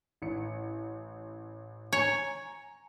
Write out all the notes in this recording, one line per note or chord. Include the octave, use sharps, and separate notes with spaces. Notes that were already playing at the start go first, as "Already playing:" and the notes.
A1 C#7
C#5 G#5 A#5